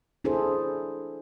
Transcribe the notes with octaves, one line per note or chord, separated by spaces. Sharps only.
D4 E4 G#4 A4 C5